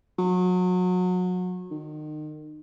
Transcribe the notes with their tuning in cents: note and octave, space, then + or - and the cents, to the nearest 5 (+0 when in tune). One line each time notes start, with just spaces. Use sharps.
F#3 -30
D#3 -30